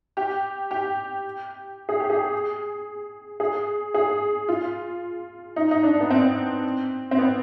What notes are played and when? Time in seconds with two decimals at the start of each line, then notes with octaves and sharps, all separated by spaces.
0.17 G4
0.71 G4
1.89 G#4
2.00 G4
2.10 G#4
3.40 G#4
3.94 G#4
4.49 F4
5.56 D#4
5.71 D#4
5.84 D4
6.01 B3
6.10 C4
7.11 C4
7.18 B3